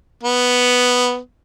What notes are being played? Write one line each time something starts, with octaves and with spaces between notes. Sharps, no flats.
B3